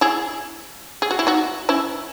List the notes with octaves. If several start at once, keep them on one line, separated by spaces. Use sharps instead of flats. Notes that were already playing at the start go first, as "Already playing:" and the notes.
E4 G#4
G#4
F#4
E4
D#4 F#4
C#4 E4